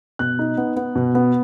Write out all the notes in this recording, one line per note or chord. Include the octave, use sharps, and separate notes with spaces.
B2 F#6
D#4
B3
B3
B2
B3